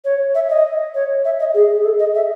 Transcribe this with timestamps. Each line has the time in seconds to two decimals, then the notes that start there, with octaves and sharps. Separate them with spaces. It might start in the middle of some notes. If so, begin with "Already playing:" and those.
0.05 C#5
0.35 E5
0.50 D#5
0.95 C#5
1.25 E5
1.40 D#5
1.54 G#4
1.75 G#4
1.85 A4
1.99 D#5
2.15 E5